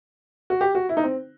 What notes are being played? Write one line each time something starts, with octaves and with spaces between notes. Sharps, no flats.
F#4
G4
F#4
E4
D#4
C4